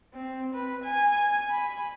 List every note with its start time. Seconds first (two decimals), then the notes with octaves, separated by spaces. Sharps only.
0.14 C4
0.54 B4
0.84 G#5
1.51 B5